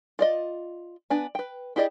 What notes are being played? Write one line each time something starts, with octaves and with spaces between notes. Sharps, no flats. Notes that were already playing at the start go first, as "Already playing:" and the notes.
F4 D5 D#5
B3 D4 G#5
B4 G5
E4 G4 G#4 D5 D#5